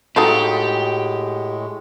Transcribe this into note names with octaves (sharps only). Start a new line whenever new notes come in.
A2 G#3 D#4 F#4 G4 A4 F5